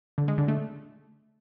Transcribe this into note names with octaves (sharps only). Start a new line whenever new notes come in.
D3
G#3
D3
A3